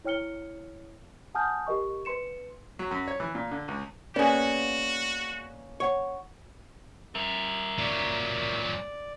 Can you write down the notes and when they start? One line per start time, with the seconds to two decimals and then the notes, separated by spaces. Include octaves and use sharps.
0.04 E4 C#5 G5 F6 C#7 G7
1.35 F#5 G#5 A5 D#6 F6 G6
1.67 G4 A#4 D#5 C#6
2.05 B4 C6 C#7 E7
2.79 F#3
2.91 F#2
3.07 C#5
3.20 E3
3.35 A#2
3.51 D3
3.68 C#2
4.16 A#3 B3 C#4 F#4 G#4 D5
5.80 C#5 F#5 C#6
7.15 A#4 E5
7.79 A#2 F#3 D5